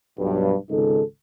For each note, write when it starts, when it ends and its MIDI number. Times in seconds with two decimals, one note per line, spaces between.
0.19 0.54 35
0.19 0.54 43
0.70 1.02 32
0.70 1.02 37
0.70 1.02 63
0.70 1.02 68
0.70 1.02 69